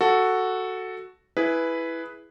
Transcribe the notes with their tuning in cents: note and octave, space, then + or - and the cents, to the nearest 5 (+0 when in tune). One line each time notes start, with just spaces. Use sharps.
F#4 +0 A4 +0
E4 +0 G#4 +10 B4 +0